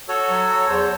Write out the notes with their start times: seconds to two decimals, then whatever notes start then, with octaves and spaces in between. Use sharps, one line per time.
0.08 F#4 A4 C#5
0.30 F#3
0.69 E2 C5